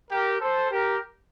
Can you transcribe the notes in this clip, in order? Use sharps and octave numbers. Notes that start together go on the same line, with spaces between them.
G4 A#4
A4 C5
G4 A#4